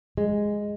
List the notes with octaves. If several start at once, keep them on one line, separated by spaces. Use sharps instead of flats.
G#3